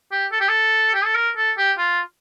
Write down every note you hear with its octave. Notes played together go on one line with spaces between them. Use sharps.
G4
A4
G4
A4
G4
A4
A#4
A4
G4
F4